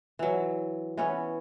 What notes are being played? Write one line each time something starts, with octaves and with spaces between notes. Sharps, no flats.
E3 F#3
E3 B3 C#4 C#5